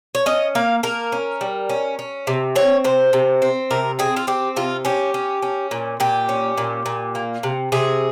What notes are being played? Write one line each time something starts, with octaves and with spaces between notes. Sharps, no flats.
C#5
C#4 D#5
A#3 F5
A#3 A#4
C#4
G3
C#4
C#4
C3
C4 C#5
C3 C5
C3
C4
C3 A#4
C4 G#4
F4
C4 G4
C3 F4
C#4 G4
C#4
C#4
A#2
A#2 G4
C#4
A#2
A#2
A#3
C3
C3 G#4